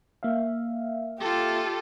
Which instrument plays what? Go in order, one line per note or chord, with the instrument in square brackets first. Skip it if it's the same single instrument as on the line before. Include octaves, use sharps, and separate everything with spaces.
[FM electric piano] A#3 E5 F5
[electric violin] F4 A4 [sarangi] G4